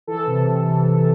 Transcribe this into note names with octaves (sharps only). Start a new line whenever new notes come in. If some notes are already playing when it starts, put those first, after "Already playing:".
E3 A4
C3
C3
E3
C3